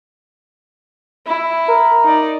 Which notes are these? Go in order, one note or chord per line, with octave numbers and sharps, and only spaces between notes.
E4
A#4
D#4 D5